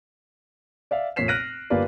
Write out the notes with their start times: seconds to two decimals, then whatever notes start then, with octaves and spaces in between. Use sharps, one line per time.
0.91 D5 E5 F5
1.16 F1 A#2 C#5 B6 C7 E7
1.28 F6 F#6 A#6 D7 D#7
1.70 G1 A#3 F4 G4 B4 D5